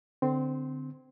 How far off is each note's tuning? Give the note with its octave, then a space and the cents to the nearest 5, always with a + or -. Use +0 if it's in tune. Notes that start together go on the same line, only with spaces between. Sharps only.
D3 +0 C4 -20 C6 +5